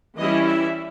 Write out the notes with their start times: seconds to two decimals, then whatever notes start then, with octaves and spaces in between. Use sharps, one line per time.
0.18 E3 G3 C#4 E4 D#5
0.46 E5